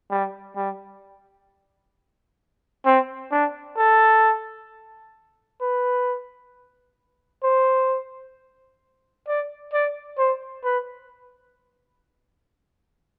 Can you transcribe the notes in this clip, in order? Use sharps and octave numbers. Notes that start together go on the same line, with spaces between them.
G3
G3
C4
D4
A4
B4
C5
D5
D5
C5
B4